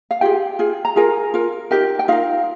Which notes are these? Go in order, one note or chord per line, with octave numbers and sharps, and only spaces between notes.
F5
F4 G4 G#4 G5
F4 G#4
A#5
F4 G#4 A#4 G#5
F4 A#4
D#4 G4 A#4 G5
G5
D#4 F4 A#4 F5